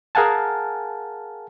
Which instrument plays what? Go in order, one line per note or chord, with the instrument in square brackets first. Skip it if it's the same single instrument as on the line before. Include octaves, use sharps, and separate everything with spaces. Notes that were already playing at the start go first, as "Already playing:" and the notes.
[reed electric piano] G#4 A#4 F5 F#5 G#5 A5